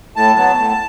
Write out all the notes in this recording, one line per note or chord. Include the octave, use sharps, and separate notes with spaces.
A2 A5
F#3 B3 A5
A2